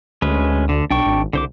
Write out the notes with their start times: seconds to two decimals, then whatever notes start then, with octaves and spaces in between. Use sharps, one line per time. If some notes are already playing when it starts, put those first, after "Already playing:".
0.22 D2 G#3 C#4 B4
0.69 D3
0.90 B1 D4 G5 C#6
1.06 G#1
1.33 C2 D3 C5 D6